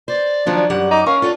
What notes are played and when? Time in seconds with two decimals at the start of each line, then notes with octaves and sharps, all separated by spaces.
0.08 C5 D5
0.47 D#3 F3 F#3 D4
0.70 F#2 F#3 G3 F#5
0.91 D#4 D6
1.06 C#4 A#4 F5
1.22 F4 A4 D5 F#5